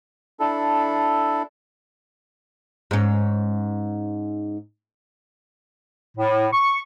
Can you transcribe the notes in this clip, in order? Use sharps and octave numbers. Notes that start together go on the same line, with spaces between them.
D4 E4 A4
G#2 C#4
A2
C#6